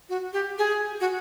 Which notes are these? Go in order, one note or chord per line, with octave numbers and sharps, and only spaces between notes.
F#4
G4
G#4
F#4